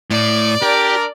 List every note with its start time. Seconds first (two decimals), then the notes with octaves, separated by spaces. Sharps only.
0.10 A2 D5
0.62 D4 G4 A#4